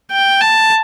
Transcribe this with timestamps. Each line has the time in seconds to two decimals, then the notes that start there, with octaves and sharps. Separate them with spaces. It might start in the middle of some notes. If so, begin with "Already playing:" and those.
0.11 G5
0.41 A5